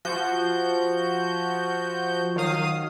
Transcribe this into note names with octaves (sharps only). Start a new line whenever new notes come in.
F3 F#4 G6
D#3 F#3 F5 D#6